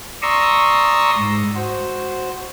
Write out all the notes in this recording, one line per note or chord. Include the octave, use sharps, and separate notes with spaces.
D5 A#5 C6 C#6 D#6 E6
G#2
F#4 C5